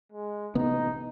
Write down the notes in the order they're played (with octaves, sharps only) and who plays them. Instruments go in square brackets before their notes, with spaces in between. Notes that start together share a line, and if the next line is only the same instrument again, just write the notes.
[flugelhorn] G#3
[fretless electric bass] A1 C3 B3 [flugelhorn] D#4